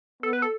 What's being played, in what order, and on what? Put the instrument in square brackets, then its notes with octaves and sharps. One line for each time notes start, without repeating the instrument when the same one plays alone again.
[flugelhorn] B3 [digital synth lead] A4
[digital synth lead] B4
A4